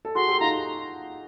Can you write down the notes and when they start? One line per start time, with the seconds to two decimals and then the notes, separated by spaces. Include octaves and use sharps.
0.05 A4
0.15 F#4 G#4 C6
0.28 G4 A4
0.40 D#4 F4 A#5